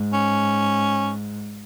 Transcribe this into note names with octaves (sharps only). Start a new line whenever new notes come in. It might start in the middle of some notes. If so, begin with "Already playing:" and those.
Already playing: G#2
C#4